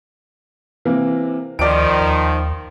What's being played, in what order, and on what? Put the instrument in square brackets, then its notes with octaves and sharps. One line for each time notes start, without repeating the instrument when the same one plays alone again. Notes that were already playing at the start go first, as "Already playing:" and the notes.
[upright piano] C3 E3 A#3
[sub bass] D2 [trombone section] D#3 F3 [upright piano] D5 D7
[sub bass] D#2